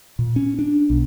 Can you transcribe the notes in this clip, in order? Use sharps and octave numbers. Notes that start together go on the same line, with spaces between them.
A#2
C#4
D4
B1